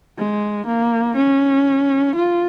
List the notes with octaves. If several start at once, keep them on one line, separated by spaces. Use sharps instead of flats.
G#3
A#3
C#4
F4